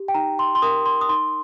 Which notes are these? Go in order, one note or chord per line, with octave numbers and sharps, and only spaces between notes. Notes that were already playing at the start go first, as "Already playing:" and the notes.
Already playing: G4
G5
D#4 A#5
C6
C6
A#4 D#6
C6
D#6
D#4 C6